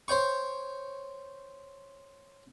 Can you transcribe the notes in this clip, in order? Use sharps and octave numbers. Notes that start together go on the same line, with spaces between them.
C5 C#5 G5 C#6